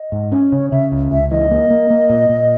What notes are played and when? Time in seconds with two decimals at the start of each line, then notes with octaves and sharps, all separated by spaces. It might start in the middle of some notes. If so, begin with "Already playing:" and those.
Already playing: D#5
0.12 G#2
0.32 C#4
0.52 C#3 C#5
0.71 C#3 E5
0.92 C#2
1.11 C#2 E5
1.31 E3 D#5
1.51 A#3
1.70 A#3
1.90 A#3
2.10 A#2
2.29 A#2